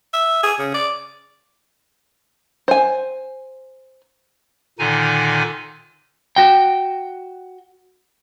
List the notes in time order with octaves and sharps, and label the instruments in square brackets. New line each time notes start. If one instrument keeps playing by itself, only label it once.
[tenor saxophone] E5
G#4
C#3
D5
[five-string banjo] C5 G#5
[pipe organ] A#2 D3 D#3 D#4 G#5
[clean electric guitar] F#4 G5